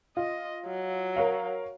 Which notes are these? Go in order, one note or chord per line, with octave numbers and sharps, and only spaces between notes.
F4 D#5
F#3
A#4 C#5 F5